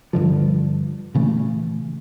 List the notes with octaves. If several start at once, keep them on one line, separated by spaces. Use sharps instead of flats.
G2 D3 F3
A#2 C#3 E3 A3